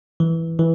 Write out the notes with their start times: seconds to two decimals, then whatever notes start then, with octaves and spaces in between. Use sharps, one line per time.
0.20 E3
0.59 E3